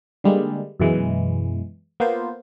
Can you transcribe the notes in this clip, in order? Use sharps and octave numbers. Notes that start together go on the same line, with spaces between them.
D3 G3 G#3 A#3
F#2 B2 E3 G#3
A#3 B3 F4 C5